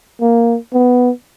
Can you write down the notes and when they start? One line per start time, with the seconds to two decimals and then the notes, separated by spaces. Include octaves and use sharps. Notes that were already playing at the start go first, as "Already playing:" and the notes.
0.21 A#3
0.74 B3